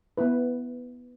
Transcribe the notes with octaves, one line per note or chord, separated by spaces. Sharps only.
B3 E4 B4